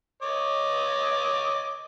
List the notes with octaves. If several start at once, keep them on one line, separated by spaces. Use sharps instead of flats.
C#5 D#5 D6